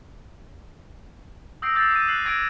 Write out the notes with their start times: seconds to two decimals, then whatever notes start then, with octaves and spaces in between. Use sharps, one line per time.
1.62 D#6 E6 G6 A#6 C7 D7
1.75 D6 E6 G6 A6 C7
1.91 D6 D#6 A6 D#7
2.08 F#6 C7 F#7
2.26 D6 E6 G#6 A#6 D7 F7